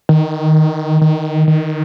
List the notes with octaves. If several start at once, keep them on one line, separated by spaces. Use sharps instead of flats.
D#3
D#3
D#3